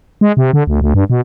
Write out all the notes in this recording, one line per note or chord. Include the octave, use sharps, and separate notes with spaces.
G#3
C3
D3
D2
D2
G2
B2